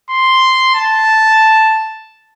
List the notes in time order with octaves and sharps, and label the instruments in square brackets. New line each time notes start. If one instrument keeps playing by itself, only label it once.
[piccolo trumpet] C6
A5